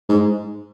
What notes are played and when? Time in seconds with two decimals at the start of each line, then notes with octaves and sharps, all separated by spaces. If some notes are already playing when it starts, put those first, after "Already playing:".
0.09 G#2